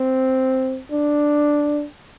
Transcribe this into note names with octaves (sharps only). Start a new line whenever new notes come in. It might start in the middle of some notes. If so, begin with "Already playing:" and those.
Already playing: C4
D4